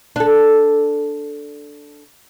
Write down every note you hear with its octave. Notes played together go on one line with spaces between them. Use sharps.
D4 A4